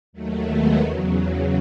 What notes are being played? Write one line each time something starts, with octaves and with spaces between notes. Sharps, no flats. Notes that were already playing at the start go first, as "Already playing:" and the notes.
D#2 D#3 F#3 A3
G#3 B3
E2 C#3 F#3